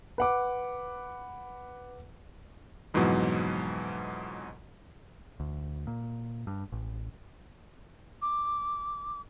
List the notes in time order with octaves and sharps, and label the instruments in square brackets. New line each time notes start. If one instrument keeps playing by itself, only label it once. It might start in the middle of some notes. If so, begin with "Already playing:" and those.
[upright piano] B4 F#5 D6
[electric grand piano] F2 G#2 B2 E3 F#3
[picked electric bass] D2
A#2
G2
A1
[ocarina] D6